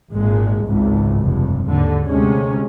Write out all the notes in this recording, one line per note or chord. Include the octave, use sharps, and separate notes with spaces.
G#1 A#2 G#3
G#1 C#2 G#2
F1 G2
D#2 G#2 D3
D2 C3 G#3 C#4